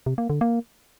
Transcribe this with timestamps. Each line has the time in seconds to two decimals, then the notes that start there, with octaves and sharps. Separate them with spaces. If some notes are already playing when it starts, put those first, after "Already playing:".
0.06 C3
0.18 A#3
0.30 D3
0.41 A#3